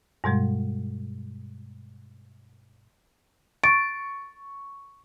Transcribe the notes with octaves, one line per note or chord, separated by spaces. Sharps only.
G2 B2 G3 G#3
C#6 A6 D7